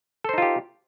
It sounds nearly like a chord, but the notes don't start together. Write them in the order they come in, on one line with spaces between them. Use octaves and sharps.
A4 C5 D#4 F4 G4